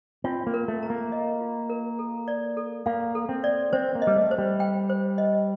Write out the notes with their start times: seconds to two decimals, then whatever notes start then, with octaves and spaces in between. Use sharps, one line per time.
0.24 C4 F4
0.47 A#3
0.54 A#4
0.68 A3
0.83 A#5
0.90 A#3
1.12 D#5
1.41 F4
1.70 A#4
1.99 A4
2.28 D5
2.57 A4
2.86 A#3 F5
3.15 A4
3.29 C4
3.44 D5
3.73 C4 C5
3.95 A#3
4.02 D#5
4.07 G3
4.16 A3
4.31 C5
4.38 G3
4.60 G5
4.90 C5
5.18 D#5